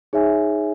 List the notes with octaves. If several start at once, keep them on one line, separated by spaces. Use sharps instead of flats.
D#4 G#4 C#5 E5 G#5